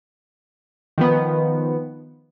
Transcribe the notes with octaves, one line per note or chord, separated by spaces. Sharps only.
D#3 F3 B3